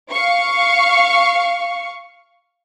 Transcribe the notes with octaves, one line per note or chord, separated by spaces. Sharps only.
F5 C#6